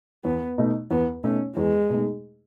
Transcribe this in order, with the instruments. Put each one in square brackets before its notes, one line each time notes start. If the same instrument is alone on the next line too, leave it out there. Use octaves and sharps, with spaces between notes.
[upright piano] E2 [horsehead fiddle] B3
[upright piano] B2 A3 D#4
[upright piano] E2 [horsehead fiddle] B3
[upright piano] B2 A3 D#4 [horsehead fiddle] C#4
[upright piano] E2 [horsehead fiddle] G#3
[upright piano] B2 A3 D#4